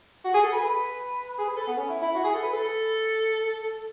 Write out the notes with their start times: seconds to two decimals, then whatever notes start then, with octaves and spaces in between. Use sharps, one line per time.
0.24 F#4
0.34 G#4
0.43 A4
0.52 B4
1.38 G#4
1.47 B4
1.57 A4
1.67 B3
1.77 C#4
1.90 E4
2.02 E4
2.15 F#4
2.24 G#4
2.34 A4
2.42 B4
2.53 A4